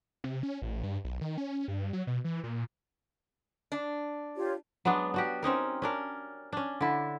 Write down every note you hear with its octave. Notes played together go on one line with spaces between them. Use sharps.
C3
C#4
A1
G2
B1
D#3
C#4
G2
F#3
B2
E3
A#2
D4
F4 G4 C#5
F#3 G#3 B3 D4
D4 F#4 G4
C4 C#4 D#4 A#4
C#4 D4 A#4
C#4 D4
D3 E4